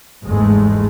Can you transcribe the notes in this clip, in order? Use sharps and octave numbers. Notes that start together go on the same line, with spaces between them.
G1 E2 G#2 G#3 A3